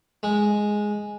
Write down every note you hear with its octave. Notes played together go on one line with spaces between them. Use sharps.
G#3